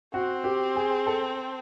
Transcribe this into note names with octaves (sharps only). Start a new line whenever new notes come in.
C4 F#4
G4
G#4
A4